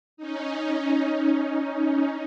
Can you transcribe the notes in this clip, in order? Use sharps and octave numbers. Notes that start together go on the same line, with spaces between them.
C#4 D#4